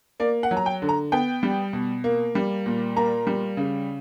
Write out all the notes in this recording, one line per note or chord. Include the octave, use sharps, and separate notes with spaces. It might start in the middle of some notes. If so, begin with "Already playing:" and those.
A#3 D5
F#5
F#3
A#5
G5
D3
A#5
B3 G5
G3
B2
A#3
G3
A#2
A#3 A#5
G3
C#3